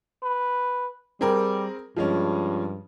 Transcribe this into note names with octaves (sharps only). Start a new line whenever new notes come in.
B4
G3 C4 G#4 A#4
G2 F3 G#3 C#4